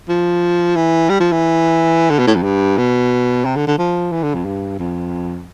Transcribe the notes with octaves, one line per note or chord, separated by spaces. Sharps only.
F3
E3
G3
F3
E3
D3
B2
A2
F2
G2
B2
C3
D3
D3
F3
E3
D3
F2
G2
F2